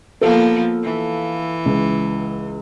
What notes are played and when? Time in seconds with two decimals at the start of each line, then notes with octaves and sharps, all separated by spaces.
0.21 F3 A#3 B3 A4 F5
0.83 E3
1.65 C#2